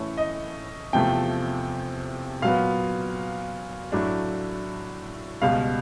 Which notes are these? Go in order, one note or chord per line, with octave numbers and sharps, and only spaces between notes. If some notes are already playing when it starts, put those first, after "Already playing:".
Already playing: A2 E3 A3 C#4
D#5
E2 C3 F3 A3 G5
A#2 F#3 B3 F5
A2 F#3 A3 D4
C#2 B2 G3 F5